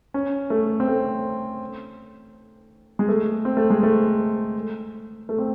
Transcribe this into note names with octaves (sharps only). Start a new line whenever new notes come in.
C#4
A3
C4
A3
G#3
A3
C4
A3
G#3
A3
A3
C4